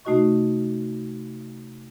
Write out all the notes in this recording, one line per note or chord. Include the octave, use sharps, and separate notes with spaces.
C3 A3 D#4 F#4 D#5 C#6